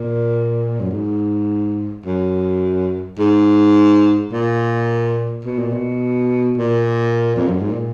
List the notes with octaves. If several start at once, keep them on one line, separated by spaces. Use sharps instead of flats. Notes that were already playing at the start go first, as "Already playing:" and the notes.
Already playing: A#2
F#2
G#2
F#2
G#2
A#2
B2
A#2
B2
A#2
F2
F#2
G#2
A#2